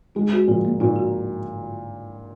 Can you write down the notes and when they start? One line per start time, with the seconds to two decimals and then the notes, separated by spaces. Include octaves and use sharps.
0.15 G#3 D#4
0.32 F#4
0.48 A#2 F3
0.65 A#3
0.80 A#2 D#4
0.96 F#4